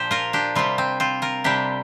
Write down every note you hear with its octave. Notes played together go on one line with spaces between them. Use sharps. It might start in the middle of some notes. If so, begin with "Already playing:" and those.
Already playing: A#2 F3 D4 G4 C5
F4 A#4
D4 G4
C3 G3 C4 F4
C4
C4 F4
F4 A#4
C3 G3 D4 G4